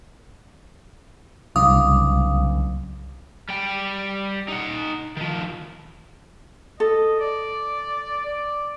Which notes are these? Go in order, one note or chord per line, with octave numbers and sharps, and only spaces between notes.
C2 C#3 F#3 D4 F5 D6 D#6
G3 G5
D#4 F#5
D#3 F3
A4 D#5
D5
D5